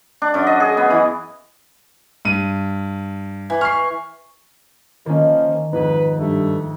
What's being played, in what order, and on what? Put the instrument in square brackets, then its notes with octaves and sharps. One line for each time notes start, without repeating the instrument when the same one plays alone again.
[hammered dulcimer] D4
F#2
D#5
G#4
B3
E3
[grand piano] G2 D#7
[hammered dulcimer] E3
[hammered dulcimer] C#6 [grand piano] F6 C7
[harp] D#3 [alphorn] F3 [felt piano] A#3 C#4
[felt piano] F2 G#2 [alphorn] B4
[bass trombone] G2 [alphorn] A3